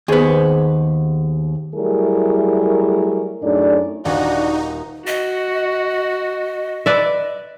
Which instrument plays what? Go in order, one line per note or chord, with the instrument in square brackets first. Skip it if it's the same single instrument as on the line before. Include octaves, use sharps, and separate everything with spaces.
[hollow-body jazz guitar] D#2 B3 [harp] G#4 C5
[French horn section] F#3 G3 A3 E4 G#4 A#4
F#2 A2 D4 D#4 G#4 D5
[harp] D#1 [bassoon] D4 [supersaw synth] D#4 [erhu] F#4
[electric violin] F#4 [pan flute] D#5
[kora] B4 D5 E5